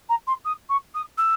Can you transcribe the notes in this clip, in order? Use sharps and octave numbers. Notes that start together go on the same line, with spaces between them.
A#5
C6
D#6
C#6
D#6
E6